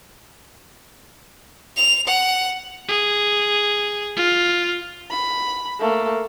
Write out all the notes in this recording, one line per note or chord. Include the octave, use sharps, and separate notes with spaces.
F7
F#5
G#4
F4
B5
A3 A#3